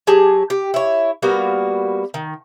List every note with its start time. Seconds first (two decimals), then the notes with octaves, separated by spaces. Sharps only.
0.07 F#3 G4 G#4 A5
0.50 G4
0.74 E4 C#5
1.22 G3 A#3 B3 F#4
2.14 D#3